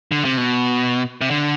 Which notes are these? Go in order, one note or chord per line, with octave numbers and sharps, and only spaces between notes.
D3
C3
B2
C3
D3